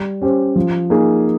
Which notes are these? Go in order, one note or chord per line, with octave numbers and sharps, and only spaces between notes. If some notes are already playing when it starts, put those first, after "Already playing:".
Already playing: G3
C#4 G4 C5
F3
A#3 D#4 G#4